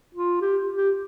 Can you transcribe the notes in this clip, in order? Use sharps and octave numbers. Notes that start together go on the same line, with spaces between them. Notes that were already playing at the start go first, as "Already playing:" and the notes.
F4
G4
G4